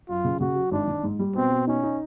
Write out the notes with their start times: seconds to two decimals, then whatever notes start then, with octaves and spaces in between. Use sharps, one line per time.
0.09 F#2 F4
0.24 C#3
0.40 C#3 F#4
0.55 F#3
0.71 G#1 D4
0.87 D#3
1.04 G#2
1.19 G3
1.36 B2 C4
1.51 B2
1.67 C#4 D#4
1.83 D#4